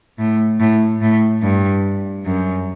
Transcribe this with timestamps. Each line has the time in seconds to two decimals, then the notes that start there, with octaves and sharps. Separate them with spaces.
0.19 A2
0.60 A2
1.01 A2
1.42 G2
2.24 F#2